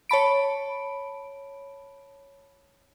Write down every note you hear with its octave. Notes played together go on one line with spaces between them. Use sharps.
C#5 A5 B5 D7